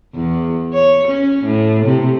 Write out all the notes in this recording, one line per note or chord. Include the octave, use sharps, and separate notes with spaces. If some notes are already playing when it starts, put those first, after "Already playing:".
E2
C#5
C#4
A2
C3